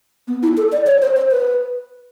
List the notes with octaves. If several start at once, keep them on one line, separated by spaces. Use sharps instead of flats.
B3
E4
A4
D5
C#5
C5
C5
B4